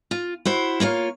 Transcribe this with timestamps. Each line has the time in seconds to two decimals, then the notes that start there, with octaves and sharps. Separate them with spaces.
0.11 F4
0.45 E4 F#4 C5
0.80 A#3 F4 C#5 F5